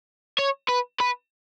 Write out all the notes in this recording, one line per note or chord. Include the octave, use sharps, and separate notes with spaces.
C#5
B4
B4